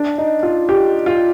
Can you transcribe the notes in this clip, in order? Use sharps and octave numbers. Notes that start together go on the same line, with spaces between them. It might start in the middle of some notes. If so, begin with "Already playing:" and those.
Already playing: D4
D#4
F4
G4
F4